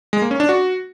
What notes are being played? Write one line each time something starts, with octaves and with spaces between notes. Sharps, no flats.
G#3
A#3
C#4
D4
F#4